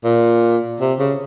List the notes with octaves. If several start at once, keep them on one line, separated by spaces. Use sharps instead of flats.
A#2
C3
C#3